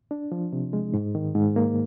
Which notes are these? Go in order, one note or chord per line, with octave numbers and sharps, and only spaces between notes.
D4
F3
C3
G#3
G#2
D#3
G#2
A#3